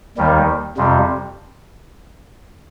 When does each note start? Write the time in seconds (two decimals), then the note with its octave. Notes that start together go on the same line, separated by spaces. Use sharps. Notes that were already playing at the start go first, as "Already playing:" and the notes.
0.17 D#2 D#3 G3
0.77 F2 C3 G3